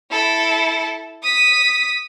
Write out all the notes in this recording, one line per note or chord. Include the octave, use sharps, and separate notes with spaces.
E4 A4
D#6 B6